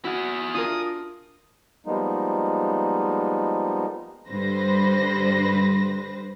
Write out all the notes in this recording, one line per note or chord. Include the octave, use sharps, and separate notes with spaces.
E4 F#4 G#4
D4 F4 A#4 D#6
F3 G3 G#3 A#3 B3 D#4
G2 D3 B4 C5 A#6